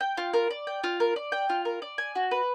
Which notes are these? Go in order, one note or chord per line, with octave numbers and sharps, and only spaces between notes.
G5
F4
A#4
D5
G5
F4
A#4
D5
G5
F4
A#4
D5
G#5
F#4
B4